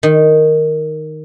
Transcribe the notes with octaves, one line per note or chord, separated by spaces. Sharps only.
D#3